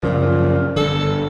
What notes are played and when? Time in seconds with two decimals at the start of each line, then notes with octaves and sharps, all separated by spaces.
0.03 F#2 A#2 C#3 F3
0.76 G1 D3 A4